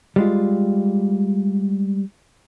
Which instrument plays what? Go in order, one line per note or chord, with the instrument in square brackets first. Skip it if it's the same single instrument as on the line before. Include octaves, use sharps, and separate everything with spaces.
[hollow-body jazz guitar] G3 G#3 F4